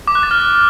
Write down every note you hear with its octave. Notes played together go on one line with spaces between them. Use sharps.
D6
F#6
A6
F6